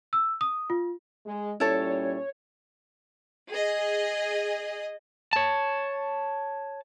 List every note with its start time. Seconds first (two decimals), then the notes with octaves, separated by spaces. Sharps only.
0.13 E6
0.41 D#6
0.70 F4
1.26 G#3
1.60 A#2 G3 C#4 E4 A4 C#5
3.50 G#4 D#5
5.33 C#5 A5